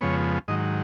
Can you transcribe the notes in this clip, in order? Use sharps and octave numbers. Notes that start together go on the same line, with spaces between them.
F2 C#3 F3 G#3 B3 C#5
G#2 D#3 F#3 D#5